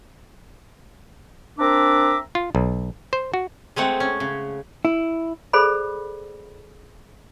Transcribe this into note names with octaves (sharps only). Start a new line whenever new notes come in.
C4 D4 A#4 E5 A#5 D6
F4
B1
C5
F#4
G#3 A3 C4 F#5
C#4
C#3
E4
G#4 A4 C5 D5 B5